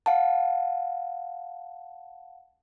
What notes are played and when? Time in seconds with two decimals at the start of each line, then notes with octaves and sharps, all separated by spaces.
0.06 F5 F#5 A5